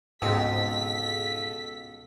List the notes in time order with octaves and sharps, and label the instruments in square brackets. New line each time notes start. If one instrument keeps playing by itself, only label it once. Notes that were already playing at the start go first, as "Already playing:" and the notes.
[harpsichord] C#2 B2 C4 [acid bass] G#2 [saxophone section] F4 A4 [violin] B6